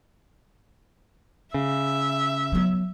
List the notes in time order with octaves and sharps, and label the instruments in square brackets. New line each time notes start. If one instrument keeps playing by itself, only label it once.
[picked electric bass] C#3 [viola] E5
[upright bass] F#3 B3